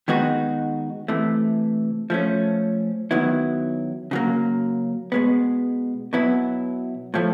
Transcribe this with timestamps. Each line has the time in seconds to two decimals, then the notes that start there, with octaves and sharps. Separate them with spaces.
0.08 D#3 G#3 B3 D#4 F#4
1.08 C3 E3 A3
2.10 F3 A3 C#4
3.11 D#3 F#3 B3 E4
4.11 C#3 F#3 A#3
5.12 B2 G#3 B3
6.13 B2 F#3 B3 E4
7.14 A2 F3 A3